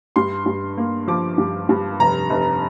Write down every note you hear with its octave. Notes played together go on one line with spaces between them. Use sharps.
G2 C6
G2
A#3
F3 D6
G2
G2
F1 A#5
F1